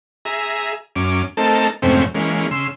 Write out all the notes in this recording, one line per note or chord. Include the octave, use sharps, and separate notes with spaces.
G#4 E5 A#5
F#2 C#4 D6
A3 C4 D#4 A4 A#4 A5
F2 G#2 C3 A3 C4 C#4
E3 G#3 A#3 C#4
C#3 C6 E6